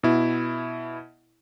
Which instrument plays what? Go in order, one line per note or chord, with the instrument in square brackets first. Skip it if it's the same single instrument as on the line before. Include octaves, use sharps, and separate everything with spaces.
[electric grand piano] B2 E4